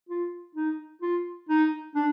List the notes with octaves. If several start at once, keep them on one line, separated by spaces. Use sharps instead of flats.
F4
D#4
F4
D#4
D4